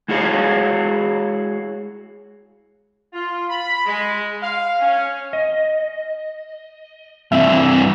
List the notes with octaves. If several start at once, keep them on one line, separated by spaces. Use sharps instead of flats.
G#3 E4 F#4 G#4 C#5 F5
F4
B5
G#3
F5
C#4
D#5
G2 E3 C4 E5